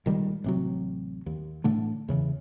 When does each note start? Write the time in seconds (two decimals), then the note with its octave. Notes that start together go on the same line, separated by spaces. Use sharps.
0.06 A#1 D#3 G3 G#3
0.44 A1 C3 F#3
1.26 D#2
1.64 A1 A2 D3 A3
2.08 E2 C#3 E3